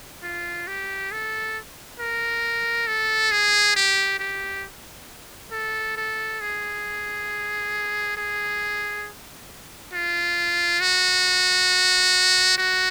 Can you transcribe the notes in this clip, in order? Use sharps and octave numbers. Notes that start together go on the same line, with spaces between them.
F4
G4
A4
A#4
A4
G#4
G4
G4
A4
A4
G#4
G#4
F4
F#4
F#4